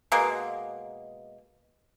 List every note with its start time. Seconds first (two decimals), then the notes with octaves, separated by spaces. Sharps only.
0.12 B2 G#3 A#3